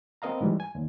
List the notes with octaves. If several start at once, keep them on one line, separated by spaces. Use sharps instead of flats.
B3 C4 A#4 D#5 F5 A#5
G#2 E3 G3 G#3
G#5
D#2